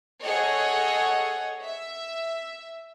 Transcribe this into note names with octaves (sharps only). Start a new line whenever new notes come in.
G#4 A4 C#5 D#5 F#5 C#6
E5